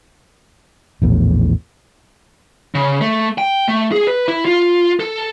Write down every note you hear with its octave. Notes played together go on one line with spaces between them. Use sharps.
A#1 E2 A2
C#3
A3
G5
A3
G#4
B4
E4
F4
A4